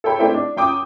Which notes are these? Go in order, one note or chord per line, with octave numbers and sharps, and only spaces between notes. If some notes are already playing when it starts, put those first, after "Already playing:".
A4 C#5 G5 B5
A3 C4 E4 D5 G5
D4
F#2 G5 D6 D#6